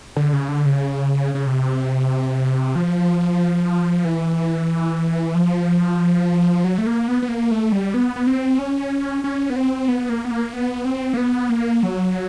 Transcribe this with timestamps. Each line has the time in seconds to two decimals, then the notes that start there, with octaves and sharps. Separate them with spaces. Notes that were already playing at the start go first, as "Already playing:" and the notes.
0.17 D3
0.33 C#3
0.48 D3
0.65 C#3
1.35 C#3
1.47 C3
2.76 F3
4.05 E3
5.35 F3
6.64 F#3
6.78 A3
6.86 A#3
7.08 B3
7.22 B3
7.29 A#3
7.51 A3
7.72 G3
7.94 B3
8.16 B3
8.27 C4
8.59 C#4
9.24 C#4
9.50 B3
9.56 C4
9.88 B3
10.09 A#3
10.25 B3
10.31 A#3
10.53 B3
10.85 C4
11.13 A#3
11.17 B3
11.50 A#3
11.83 F#3